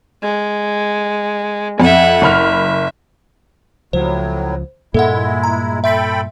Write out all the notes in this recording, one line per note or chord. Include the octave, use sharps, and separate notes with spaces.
G#3
F2 E5 F#5
F#1 E5 B5 F6
C#2 A2 F3 F#3 C5
G2 A#2 G#3 A#3 E4 A4 E5 F#5
A#5
A4 E5 G5 B5 C6 B6